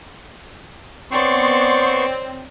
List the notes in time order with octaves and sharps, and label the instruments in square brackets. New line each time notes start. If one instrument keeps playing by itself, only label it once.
[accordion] B3 C6 C#6 [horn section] C4 [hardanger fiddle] C#5 D5